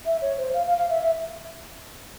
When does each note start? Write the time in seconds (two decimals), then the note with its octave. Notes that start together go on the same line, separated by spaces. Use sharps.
0.06 E5
0.22 C#5
0.38 C5
0.54 F5
0.67 F5
0.78 F5
0.90 E5
1.02 E5